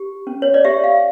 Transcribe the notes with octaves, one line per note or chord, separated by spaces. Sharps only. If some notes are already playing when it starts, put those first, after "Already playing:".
Already playing: G4
C#4
C#5
D5
G4 E5
F5